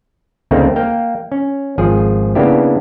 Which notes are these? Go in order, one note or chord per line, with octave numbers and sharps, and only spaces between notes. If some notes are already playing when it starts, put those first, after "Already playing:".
D2 C#3 A3 A#3 C4 D#4
A#3 F5 G5
C#4
G#1 F3 G#4
C#3 A#3 B3 D4 E4 G4